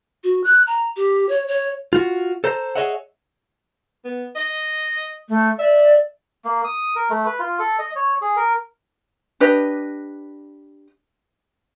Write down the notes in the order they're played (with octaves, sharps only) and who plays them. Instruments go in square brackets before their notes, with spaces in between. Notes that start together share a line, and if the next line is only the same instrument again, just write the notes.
[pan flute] F#4
F#6
A#5
G4
C#5
C#5
[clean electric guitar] F4 F#4
A4 C5 A#5
G#4 A#4 C#5 D#5 E5 F#5
[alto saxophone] B3
D#5
[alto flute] A3
[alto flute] D5 [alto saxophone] E5
[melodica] A#3
D#6
A#4
A3
B4
F4
A4
D#5
C#5
G#4
A#4
[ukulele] D4 G4 B4 D#5